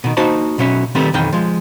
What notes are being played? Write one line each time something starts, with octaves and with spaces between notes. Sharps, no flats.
B2 D#3
A#3 D#4 F#4 C5 A5 B5
B1 B2 F#3 C#4 E5
D#3 G3 A3 B3 C4
B1 F2 D#3 E3 G5
F3 G#3